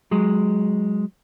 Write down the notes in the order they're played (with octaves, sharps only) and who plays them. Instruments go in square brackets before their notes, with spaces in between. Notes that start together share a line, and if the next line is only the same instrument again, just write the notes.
[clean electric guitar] F#3 G#3